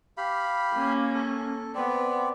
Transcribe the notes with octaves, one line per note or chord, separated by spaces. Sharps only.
G4 F5 B5
A#3 C#4
A4
B3 C4 D5